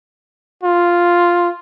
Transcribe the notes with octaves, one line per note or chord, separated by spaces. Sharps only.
F4